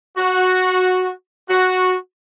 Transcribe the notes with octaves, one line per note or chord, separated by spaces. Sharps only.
F#4
F#4